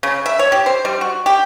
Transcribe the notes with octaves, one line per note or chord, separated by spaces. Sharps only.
C#3
E5
C#5
G4
C5
G3
F#4
G4